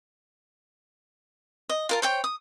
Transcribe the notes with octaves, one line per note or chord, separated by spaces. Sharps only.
D#5
F4 A#4 A5
C5 C#5 G5
D#6